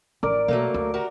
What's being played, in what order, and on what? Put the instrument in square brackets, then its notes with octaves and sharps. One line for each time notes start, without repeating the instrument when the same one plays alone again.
[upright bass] A1 D#3 [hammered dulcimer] A#4 D5
[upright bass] B2 [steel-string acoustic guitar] F#3 A3 A#3
[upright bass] D2
[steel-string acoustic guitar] F#4 G4 A#4